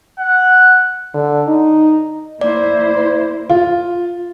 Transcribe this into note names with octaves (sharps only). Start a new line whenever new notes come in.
F#5
D3
D#4
A#3 E4 C5 D5
F4